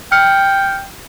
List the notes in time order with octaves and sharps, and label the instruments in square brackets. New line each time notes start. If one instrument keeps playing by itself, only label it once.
[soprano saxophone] G5 [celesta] F6 C#7